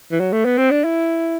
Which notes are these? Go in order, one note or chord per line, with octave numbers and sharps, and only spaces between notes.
E3
F#3
A3
B3
C4
D4
E4